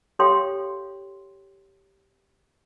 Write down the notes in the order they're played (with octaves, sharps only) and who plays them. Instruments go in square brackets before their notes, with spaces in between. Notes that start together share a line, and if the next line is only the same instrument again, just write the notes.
[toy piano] G4 A4 C#5 F5 G5 C6